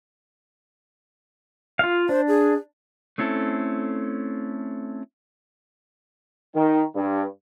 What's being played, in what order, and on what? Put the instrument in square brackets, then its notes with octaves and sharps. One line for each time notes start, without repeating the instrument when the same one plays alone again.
[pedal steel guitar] F4 F5
[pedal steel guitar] D4 [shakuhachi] C5
[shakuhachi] G#4
[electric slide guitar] A3 C4 C#4 E4 A4
[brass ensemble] D#3
G2